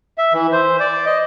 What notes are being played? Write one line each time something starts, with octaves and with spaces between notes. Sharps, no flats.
E5
E3
C5
D5
D#5